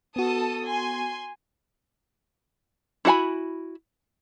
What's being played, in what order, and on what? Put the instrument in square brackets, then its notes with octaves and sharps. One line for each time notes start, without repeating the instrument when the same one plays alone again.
[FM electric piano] B3 F#4 [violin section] A4 A5 D#6
[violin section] G#5 C6
[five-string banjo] E4 F#4 F#5 G#5 B5